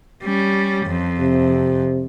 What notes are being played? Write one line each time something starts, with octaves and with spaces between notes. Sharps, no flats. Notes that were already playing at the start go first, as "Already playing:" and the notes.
G3 C#4
F2
C3